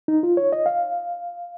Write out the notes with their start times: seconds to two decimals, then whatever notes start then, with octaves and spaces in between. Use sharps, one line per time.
0.08 D#4
0.23 F4
0.37 C#5
0.52 D#5
0.66 F5